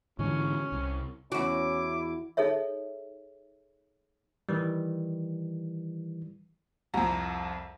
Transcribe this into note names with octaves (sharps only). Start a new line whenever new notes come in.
G#2 D3 E3 C#4
C2
E2 C#4 E4 F#4 D6
D#4 G#4 A4 C#5 E5
D#3 E3 G3
C2 F2 A#5